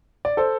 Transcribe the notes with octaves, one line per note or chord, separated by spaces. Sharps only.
D5
A4 C5